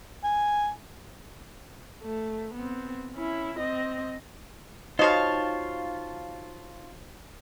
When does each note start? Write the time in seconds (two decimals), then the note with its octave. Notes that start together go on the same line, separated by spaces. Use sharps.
0.24 G#5
2.03 A3
2.55 B3 C4
3.14 C#4 E4
3.58 C4 D#5
4.99 D#4 F4 F#4 C5 C#5 D#5 F5 A5